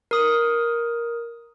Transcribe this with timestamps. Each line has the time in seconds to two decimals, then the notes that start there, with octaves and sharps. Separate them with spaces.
0.11 A#4 D#6